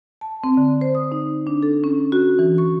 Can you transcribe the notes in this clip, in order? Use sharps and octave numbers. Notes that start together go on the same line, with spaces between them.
A5
C4
D3
C5
D#6
D#4
D4
A4
C#4
F#4
E3
C#6